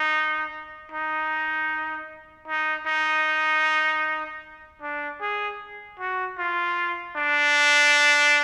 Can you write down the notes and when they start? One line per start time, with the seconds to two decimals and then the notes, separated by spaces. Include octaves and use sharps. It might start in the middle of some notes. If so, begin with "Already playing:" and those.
Already playing: D#4
0.92 D#4
2.48 D#4
2.87 D#4
4.82 D4
5.21 G#4
6.00 F#4
6.38 F4
7.16 D4